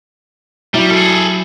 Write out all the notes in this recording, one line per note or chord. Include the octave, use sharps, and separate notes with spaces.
F#3 G3 E4
G#4 A4